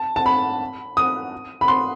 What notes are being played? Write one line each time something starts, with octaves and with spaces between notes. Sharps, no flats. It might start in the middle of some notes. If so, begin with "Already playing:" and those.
Already playing: A5
A5
B5
D#6
B5
C6